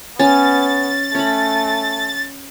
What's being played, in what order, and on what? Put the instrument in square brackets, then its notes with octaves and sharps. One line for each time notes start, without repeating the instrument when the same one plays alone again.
[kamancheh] B3 [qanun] C#4 [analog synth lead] A6
[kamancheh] A3 [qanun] C#4 B5